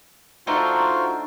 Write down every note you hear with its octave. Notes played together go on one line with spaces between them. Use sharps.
A3 D4 D#4 F4 F#4 C5